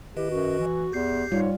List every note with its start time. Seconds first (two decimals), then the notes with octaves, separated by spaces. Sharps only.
0.16 D#3 E4 G4 B4 D#5
0.30 F#2 F#4
0.60 E3
0.92 E2 G4 G6 C7
1.32 G#2 G3 F4 C#5